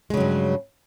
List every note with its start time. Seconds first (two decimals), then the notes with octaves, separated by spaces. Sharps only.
0.10 G#3
0.14 C#3
0.17 F#3
0.20 G2